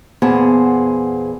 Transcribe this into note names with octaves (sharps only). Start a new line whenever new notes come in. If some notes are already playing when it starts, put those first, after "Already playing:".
E2 A#2 B3 G#4 C5 A5